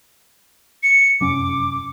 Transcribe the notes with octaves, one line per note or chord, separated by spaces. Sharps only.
C#7
F1 F#2 C#4 D6